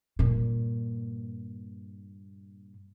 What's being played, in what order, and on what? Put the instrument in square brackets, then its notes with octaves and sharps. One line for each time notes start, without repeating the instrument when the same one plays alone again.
[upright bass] G2 A#2